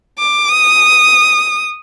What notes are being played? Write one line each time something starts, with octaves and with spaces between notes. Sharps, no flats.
D6
D#6